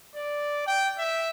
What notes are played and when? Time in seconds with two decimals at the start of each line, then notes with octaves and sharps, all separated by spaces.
0.15 D5
0.67 G5
0.98 E5